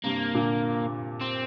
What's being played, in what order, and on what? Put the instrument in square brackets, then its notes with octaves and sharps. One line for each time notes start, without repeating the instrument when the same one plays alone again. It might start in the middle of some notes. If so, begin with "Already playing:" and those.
[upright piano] G2 C3 [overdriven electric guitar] A#3
[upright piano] A#2 D3
[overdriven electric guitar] C4